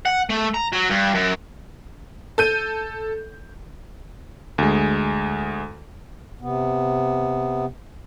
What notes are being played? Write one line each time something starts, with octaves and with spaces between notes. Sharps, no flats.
F#5
A3
A#5
F#3
G2
F#2
A4 G6 D#7
D2 G#3
C3 B3